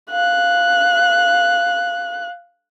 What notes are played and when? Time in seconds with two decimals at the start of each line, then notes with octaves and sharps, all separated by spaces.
0.11 F5 F#6